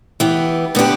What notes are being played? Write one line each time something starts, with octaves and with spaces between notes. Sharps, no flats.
E3 B3 G4
D3 B3 D4 G4